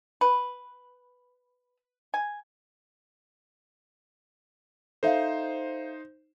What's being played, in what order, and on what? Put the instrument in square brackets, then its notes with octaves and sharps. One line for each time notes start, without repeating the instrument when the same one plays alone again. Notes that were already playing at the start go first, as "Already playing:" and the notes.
[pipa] B4
G#5
[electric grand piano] D#4 C5 [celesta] A4 E5 F5